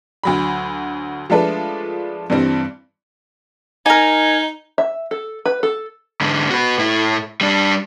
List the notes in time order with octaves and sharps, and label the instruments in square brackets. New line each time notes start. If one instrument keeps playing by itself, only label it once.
[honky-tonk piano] D2 F#3 B5
F3 G#3 A3 D4 A4 B4
G2 E3 G3 C4
[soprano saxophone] D#4 [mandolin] A#4 G#5
[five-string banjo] E5
A4
B4
A4
[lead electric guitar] G#2 D3
F#4 B4
A2 E4
G3 D4